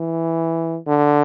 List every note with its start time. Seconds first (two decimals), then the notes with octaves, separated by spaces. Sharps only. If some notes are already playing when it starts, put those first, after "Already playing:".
Already playing: E3
0.87 D3